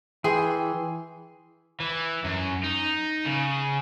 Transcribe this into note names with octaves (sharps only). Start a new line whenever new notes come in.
E3 G#4 G5 C6
E3
F#2
D#4
C#3